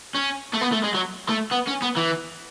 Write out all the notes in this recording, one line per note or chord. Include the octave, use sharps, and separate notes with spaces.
C#4
A3
B3
A3
G#3
F#3
A3
B3
C#4
B3
E3